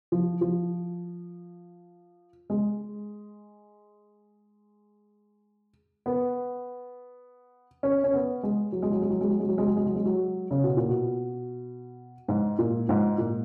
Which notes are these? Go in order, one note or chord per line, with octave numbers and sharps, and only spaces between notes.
F3
F3
G#3
B3
C#4
C#4
B3
G#3
F#3
G#3
F#3
G#3
F#3
G#3
F#3
G#3
F#3
G#3
F#3
G#3
F#3
G#3
F#3
C#3
B2
A#2
B2
G#2
A#2
G#2
A#2